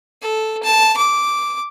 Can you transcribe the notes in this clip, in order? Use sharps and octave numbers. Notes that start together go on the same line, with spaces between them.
A4
A5
D6